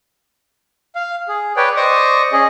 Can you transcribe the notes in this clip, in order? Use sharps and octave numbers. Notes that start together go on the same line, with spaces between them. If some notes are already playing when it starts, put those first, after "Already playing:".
F5
G#4
B4 C#5 D5 G5
C5 D5 D#5 C#6 D#6
C#4 G#4 D#5